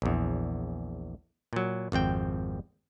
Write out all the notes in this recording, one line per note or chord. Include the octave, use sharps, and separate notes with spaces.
A#1 E2
A#2 F#3
G#1 F2 C4 G5